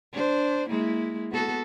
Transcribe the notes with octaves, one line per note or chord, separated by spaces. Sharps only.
D4 C5
G#3 A#3 E4
B3 F#4 A4